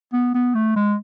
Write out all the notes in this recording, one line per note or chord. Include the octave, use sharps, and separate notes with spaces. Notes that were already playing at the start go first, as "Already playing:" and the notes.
B3
B3
A3
G#3